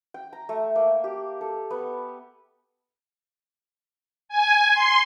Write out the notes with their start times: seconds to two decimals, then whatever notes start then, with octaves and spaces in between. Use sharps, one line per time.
0.14 G5
0.33 A#5
0.49 A3
0.76 A#3
1.04 G4
1.41 A4
1.70 B3
4.29 G#5
4.72 C6